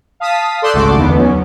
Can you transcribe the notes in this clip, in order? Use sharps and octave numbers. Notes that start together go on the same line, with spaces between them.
F5 A5 D#6 B6
A4 D5 C6 E6 F#6 G6
G#1 C#2 C#3 A3 F#4 D6
E2 D3 D#3 B3
F#3 C#4